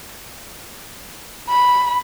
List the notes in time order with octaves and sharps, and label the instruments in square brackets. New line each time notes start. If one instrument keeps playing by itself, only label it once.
[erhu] B5